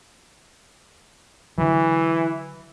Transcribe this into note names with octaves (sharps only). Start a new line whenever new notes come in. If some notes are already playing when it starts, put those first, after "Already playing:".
D3 E3 F#3